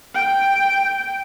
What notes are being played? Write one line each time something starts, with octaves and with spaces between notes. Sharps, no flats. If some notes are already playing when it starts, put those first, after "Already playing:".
G5